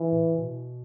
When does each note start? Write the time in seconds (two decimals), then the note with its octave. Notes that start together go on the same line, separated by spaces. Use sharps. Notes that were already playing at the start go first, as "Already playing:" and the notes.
Already playing: E3
0.12 A2
0.36 B2